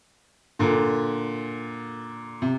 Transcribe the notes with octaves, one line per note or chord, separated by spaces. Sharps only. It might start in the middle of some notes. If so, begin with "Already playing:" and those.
A#2 D3
C3